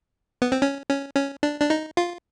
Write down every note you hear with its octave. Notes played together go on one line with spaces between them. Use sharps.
B3
C4
C#4
C#4
C#4
D4
D4
D#4
F4